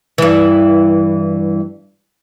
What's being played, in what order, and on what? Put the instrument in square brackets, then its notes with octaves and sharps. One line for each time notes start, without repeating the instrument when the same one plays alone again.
[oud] G2 E3